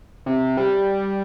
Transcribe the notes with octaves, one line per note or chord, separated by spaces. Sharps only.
C3
G3